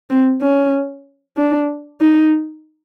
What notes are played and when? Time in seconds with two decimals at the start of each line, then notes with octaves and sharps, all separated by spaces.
0.10 C4
0.42 C#4
1.37 D4
2.01 D#4